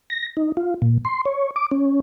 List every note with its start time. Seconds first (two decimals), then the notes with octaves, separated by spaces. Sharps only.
0.10 A#6
0.37 D#4
0.57 F4
0.82 A#2
1.05 C6
1.25 C#5
1.56 D6
1.71 C#4